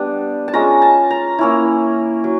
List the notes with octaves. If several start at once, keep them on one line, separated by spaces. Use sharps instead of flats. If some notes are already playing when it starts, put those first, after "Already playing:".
Already playing: G3 B3 D4
A5
G#3 C#4 F4 A#5
A5
A#5
A#3 C#4 E4
F#3